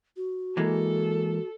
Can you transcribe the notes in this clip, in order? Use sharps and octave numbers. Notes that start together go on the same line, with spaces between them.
F#4
E3 G#3 A#3 A4